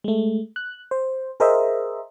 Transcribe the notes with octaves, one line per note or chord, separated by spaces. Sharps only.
G#3 A3
F#6
C5
G#4 A#4 C5 D#5 E5